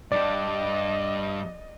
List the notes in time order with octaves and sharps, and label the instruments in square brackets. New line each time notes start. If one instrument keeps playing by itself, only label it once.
[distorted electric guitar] G2 G4 [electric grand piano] D5 [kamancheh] D#5